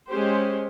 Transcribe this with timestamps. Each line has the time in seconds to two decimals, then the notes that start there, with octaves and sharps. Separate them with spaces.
0.09 G#3 C#4 G4 C5